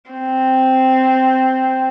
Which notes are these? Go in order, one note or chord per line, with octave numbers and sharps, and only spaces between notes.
C4